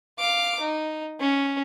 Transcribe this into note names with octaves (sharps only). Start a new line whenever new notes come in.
F5 D6
D#4
C#4